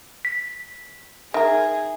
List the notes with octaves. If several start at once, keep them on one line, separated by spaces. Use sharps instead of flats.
B6
D#3 G#4 A#4 E5